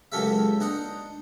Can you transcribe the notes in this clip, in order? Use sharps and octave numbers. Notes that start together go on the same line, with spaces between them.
C#2 F#3 G4 A4 A#4 E5
D4 D#4 D#5 F#5